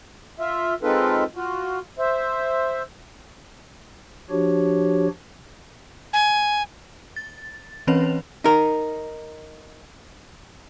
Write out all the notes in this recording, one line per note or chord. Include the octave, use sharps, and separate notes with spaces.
F4 E5
G#3 C4 D#4 F4 A4 B4
F4 F#4
C5 E5
F3 D4 F#4 G4 C#5
G#5
A6
E3 C4 C#4 B4 C#5 F7
D#4 A#4